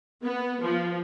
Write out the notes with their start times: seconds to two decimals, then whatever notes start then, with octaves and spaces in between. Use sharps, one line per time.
0.23 B3
0.63 F3